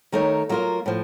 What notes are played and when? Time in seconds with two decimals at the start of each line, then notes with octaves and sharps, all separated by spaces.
0.12 D#3 A3 D#4 A#4 C#5
0.49 F#3 A#3 F4 A#4
0.86 A2 F3